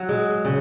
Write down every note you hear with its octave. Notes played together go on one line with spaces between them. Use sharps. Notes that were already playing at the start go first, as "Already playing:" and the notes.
Already playing: F#3
G#3
C#3